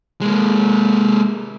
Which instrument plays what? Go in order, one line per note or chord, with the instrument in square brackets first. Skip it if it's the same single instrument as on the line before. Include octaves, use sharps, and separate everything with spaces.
[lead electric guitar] G#3 A#3